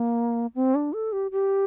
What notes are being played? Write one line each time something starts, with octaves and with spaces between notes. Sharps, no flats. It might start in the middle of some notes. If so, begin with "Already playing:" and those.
Already playing: A#3
C4
D4
A4
G4
G4